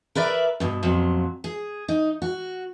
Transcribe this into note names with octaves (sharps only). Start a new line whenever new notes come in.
A#4 B4 D5 E5
G2 B2
F2 A#2 F#3
G#4
D#4
F#4